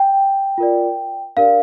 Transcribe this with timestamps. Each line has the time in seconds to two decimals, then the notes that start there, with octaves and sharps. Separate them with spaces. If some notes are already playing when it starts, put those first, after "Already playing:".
Already playing: G5
0.58 F4 A#4 D5
1.37 D4 G4 A#4 D5 F5